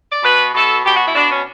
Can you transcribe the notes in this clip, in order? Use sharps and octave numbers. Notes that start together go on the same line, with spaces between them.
D5
B2 B4
B2 A4
B2 G4
F#4
E4
B2 D4
C#4